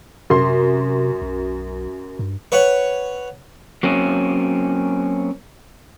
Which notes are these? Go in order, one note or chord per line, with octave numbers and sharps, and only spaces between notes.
F#2 C3 C6
B1
G2
B4 C#5 F#5
F#3 A#3 C4 C#4